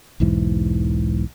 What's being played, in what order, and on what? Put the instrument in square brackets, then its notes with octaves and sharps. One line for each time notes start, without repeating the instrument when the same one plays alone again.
[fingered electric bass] B1 E2 G#2 E3